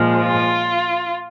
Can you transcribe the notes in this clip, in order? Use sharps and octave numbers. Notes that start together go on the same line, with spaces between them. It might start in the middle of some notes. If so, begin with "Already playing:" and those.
Already playing: A#2 F3 G#3
F4